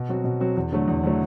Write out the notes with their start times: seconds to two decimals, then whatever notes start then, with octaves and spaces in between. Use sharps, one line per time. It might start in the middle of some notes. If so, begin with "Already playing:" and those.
Already playing: B2
0.09 F#3 C4 F#4
0.24 B2
0.40 F#3 C4 F#4
0.56 E2
0.72 D3 F#3 A3
0.88 E2
1.03 D3 F#3 A3